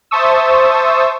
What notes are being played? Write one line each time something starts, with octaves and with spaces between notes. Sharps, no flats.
C5 E5 A5 C#6 D#6 E6